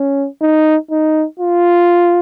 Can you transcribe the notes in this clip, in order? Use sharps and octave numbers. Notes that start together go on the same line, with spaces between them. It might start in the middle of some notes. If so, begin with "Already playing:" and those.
Already playing: C#4
D#4
D#4
F4